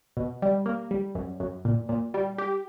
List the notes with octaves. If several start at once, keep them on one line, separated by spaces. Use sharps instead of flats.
B2
G3
A#3
G3
F#2
F#2
A#2
A#2
G3
G4